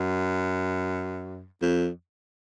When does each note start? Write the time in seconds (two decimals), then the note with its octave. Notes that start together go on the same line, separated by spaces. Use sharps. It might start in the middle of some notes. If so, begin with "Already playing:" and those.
Already playing: F#2
1.62 F2